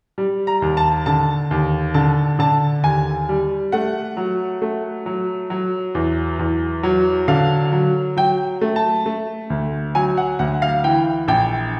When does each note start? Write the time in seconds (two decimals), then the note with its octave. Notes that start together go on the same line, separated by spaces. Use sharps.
0.18 G3
0.47 A#5
0.62 D#2
0.77 A5
1.06 D3 A5
1.51 D#2
1.94 D3 A5
2.39 D3 A5
2.83 D#2 G#5
3.29 G3
3.72 A3 F#5
4.17 F#3
4.62 A3
5.06 F#3
5.50 F#3
5.95 E2
6.39 E2
6.83 F#3
7.28 D3 F5
7.73 F#3
8.17 F#3 G5
8.61 A3
8.76 A5
9.06 A3
9.50 D2
9.95 F#3 G#5
10.17 F#5
10.39 D2 F#5
10.62 F5
10.84 E3 G5
11.28 A#1 G5